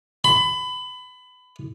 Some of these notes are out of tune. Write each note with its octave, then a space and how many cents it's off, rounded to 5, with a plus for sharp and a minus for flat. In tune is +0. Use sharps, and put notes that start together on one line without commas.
B5 +25